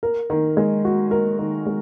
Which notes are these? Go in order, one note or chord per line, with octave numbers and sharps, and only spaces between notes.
A#4
D#3
G#3
F#4
A#4
D#3
G#3